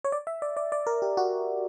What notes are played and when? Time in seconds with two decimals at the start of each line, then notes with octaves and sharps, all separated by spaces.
0.04 C#5
0.12 D5
0.27 E5
0.42 D5
0.57 D5
0.72 D5
0.87 A#4
1.02 G4
1.17 F#4